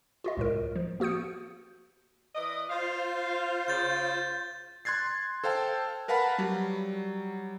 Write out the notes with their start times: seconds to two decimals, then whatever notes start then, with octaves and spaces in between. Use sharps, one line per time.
0.24 F4 F#4 D#5
0.37 C#2 A2 A#4
0.76 F3
1.00 A#3 F#4 D#6 G6 C#7
2.35 E3 D5 D#5
2.70 F4 C5 F5
3.68 C#3 G6 A6
4.85 C6 F#6 G#6 A6 C7
5.44 A4 C5 F5 G5 A5
6.08 A#4 B4 F5 F#5 A5 B5
6.38 F#3 G3